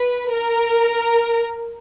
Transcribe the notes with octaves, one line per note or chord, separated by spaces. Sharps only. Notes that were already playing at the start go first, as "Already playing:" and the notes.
Already playing: B4
A#4